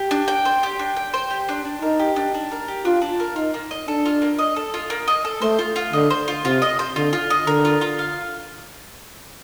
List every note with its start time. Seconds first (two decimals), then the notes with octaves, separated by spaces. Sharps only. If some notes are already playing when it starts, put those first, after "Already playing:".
Already playing: G4
0.11 D4
0.28 G5
0.45 C5
0.63 G4
0.79 D4
0.97 G5
1.14 C5
1.30 G4
1.49 D4
1.65 D4
1.82 D#4 A#4
2.00 G4
2.16 D4
2.34 D4
2.51 A#4
2.68 G4
2.85 D4 F4
3.02 D4
3.20 A#4
3.36 D#4 F4
3.54 A#3
3.71 D#5
3.88 D4 A4
4.06 F4
4.22 A#3
4.39 D#5
4.56 A4
4.74 F4
4.90 A#3
5.08 D#5
5.25 A4
5.42 A3 C5
5.59 F4
5.76 F4
5.93 D3 D#5
6.11 C5
6.28 F4
6.45 C3 F4
6.62 D#5
6.79 C5
6.96 D3 F4
7.13 F4
7.30 D#5
7.47 D3 A#4
7.65 F4
7.81 F4
7.99 F5